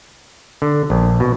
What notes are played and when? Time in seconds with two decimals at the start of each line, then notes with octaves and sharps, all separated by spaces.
0.62 D3
0.90 A#1
1.20 B2